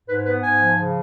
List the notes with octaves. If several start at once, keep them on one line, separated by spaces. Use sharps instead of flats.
G#2 B4
B3 B4
G#2 G#5
F3
C#3